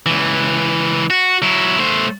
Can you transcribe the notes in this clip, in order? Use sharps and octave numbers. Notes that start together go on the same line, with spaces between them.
C#2 E3
F#4
F#3 E4
A3 C5